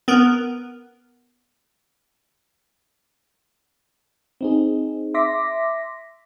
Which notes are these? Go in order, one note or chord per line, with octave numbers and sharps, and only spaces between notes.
B3 A#4
C4 D#4 G#4
E5 C6 D6 A#6 B6